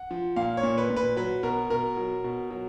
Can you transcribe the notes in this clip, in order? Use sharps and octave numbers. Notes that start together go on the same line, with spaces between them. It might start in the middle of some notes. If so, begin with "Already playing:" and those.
Already playing: F#5
F3
A#2 F5
C#5
A#2
B4
A#2
B4
F#3 B4
B2 A#4
B2 A#4
F#3
B2
F#3